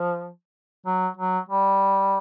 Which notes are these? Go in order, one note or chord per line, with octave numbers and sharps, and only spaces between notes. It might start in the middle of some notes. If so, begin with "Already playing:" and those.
Already playing: F3
F#3
F#3
G3